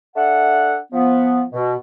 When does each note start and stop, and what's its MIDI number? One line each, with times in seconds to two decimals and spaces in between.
0.16 0.76 62
0.16 0.76 69
0.16 0.76 76
0.16 0.76 78
0.93 1.43 53
0.93 1.43 59
1.53 1.75 47